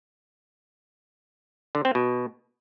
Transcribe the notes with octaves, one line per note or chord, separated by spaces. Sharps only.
D3
C4
B2